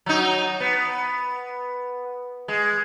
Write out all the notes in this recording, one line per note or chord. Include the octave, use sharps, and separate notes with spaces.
F#3 D#4
B3
G#3